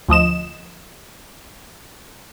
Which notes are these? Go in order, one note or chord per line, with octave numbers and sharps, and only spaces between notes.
D2 F3 D#5 E7